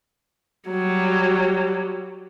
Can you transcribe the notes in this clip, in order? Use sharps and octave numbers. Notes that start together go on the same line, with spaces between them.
F#3 G3